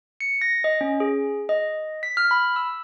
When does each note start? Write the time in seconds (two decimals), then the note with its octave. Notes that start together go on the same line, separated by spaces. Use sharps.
0.20 C#7
0.41 A#6
0.64 D#5
0.81 C#4
1.00 G#4
1.49 D#5
2.03 B6
2.17 F6
2.31 B5
2.56 E6